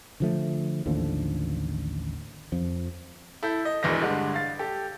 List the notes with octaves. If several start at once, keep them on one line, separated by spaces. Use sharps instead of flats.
D3 F3 A3
A1 D#2 D3 F3
F2 F3
E4 A4 G6
D#5
E1 A#1 E3 G6 A#6
G2 D3 G#3
F5 A6
G4 A4